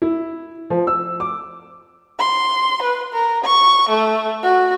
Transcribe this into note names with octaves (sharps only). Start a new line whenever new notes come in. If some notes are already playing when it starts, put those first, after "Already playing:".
E4
F3
E6
D6
C6
B4
A#4
C#6
A3
F#4